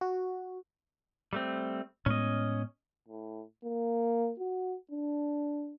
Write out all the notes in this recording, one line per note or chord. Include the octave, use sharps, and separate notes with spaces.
F#4
G3 A3 C4
A2 G#3 B3 C#4 D#5
A2
A#3
F#4
D4